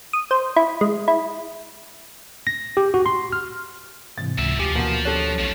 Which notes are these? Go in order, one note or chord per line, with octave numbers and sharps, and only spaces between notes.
D#6
C5
E4
G#3
E4
A#6
G4
F#4
C6
F6
G#2 C3 E3 A6
C#2 F#3 E5
D2 F3 G4 G#5 D6
B2 E3 A#3 F#4
C#4 G4 A4 F#6
B1 F3 A3